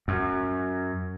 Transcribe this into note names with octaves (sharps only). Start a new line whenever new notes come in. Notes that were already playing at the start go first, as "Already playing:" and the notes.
F#2